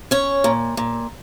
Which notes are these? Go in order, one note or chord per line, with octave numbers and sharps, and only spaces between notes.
C#4 C#5
A#2
A#2